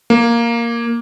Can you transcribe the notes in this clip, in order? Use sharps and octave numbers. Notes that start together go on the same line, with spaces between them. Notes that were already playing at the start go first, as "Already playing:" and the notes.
A#3